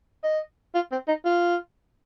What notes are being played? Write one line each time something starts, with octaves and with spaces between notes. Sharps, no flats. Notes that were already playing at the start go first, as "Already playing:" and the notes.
D#5
F4
C4
D#4
F4